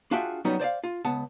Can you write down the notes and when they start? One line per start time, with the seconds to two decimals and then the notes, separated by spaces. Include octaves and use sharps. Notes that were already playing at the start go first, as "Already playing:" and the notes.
0.11 D4 F4 F#4 G#4 E5 G5
0.45 F#3 G3 B3 C#4 D#4 F#4
0.60 C5 D5 D#5 F5
0.84 F4
1.05 C#2 B3 F#5 A5